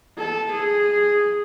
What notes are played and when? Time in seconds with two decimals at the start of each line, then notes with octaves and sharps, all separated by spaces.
0.17 A4
0.52 G#4